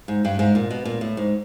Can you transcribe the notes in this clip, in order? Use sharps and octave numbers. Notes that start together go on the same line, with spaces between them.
G#2
G2
G#2
A#2
B2
A#2
A2
G#2